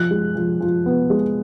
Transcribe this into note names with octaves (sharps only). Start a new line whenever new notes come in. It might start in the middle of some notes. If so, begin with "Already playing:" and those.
Already playing: F3 F#6
G#3
F3
F3
B3
G#3